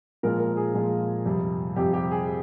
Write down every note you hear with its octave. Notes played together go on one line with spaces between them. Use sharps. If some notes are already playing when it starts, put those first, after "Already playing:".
A#2 F3 G#3 A#4
A#4
G#4
A#2 F3 G#3
F2 C3 G3
F2 C3 G3 G4
G4
G#4